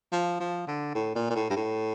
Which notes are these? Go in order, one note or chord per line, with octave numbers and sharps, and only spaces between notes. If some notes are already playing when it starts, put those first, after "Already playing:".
F3
F3
D3
A2
A#2
A#2
A2
G2
A2